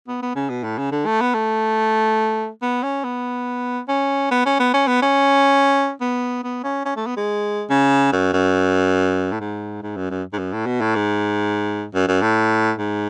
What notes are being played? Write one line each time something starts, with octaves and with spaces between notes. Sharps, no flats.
B3
B3
C#3
B2
A2
C#3
D3
A3
B3
A3
B3
C#4
B3
C#4
B3
C#4
B3
C#4
B3
C#4
B3
B3
C#4
C#4
A3
B3
G#3
C#3
F#2
F#2
A2
G#2
G#2
F#2
F#2
G#2
F#2
A2
B2
A2
G#2
F#2
F#2
A2
G#2